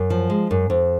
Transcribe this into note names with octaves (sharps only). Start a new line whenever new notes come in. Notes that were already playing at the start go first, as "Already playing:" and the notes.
Already playing: F#2
F3
G#3
F#2
F2